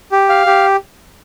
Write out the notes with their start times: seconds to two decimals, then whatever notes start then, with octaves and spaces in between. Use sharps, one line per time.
0.12 G4
0.29 F5
0.46 G4